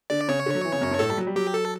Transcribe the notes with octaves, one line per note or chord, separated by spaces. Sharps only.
D3 D5
C#3 C#5
D3
F#3
E3
C#3
F#2
G2
A2 A4
G3
F#3
G3
F#3 G4
A4